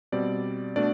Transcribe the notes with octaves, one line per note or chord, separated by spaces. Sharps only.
B2 G3 C4 D5
B2 A3 D4 D5